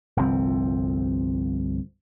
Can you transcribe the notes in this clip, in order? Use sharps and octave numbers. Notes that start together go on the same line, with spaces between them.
G1 C2 F3 C4